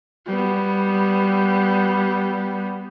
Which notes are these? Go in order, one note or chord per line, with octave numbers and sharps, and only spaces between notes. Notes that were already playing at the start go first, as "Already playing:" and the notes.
G3 B3